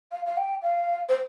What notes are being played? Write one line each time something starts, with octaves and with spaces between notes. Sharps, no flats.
F5
F5
G5
F5
C5